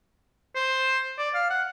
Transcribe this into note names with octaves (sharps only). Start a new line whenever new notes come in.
C5
D5
F5
F#5